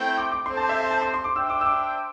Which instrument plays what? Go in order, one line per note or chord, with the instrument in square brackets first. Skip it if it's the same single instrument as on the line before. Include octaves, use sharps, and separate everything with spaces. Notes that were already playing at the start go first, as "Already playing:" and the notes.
Already playing: [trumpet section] A3 C4 E4 C5 G5
[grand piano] D6
D6
[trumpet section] C4 A4 C5 [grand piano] C6
[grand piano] A5
E5
E5
A5
C6
C6
D6
[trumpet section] D4 C5 E5 G5 [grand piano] E6
[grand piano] D6
E6
D6